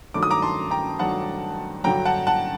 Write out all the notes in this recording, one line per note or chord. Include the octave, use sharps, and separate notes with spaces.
G2 D#3 F#3 A3 D6
D#6
A#5 D6
A5 C6
G5 A#5
G2 D#3 F#3 A3 F#5 A5
G2 D3 F#3 G5 A#5
F#5 A5
F#5 A5